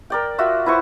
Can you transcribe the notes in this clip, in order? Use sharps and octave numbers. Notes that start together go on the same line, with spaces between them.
A#4 D5 G5
F4 F#4 E5
E4 B4 C5 C#6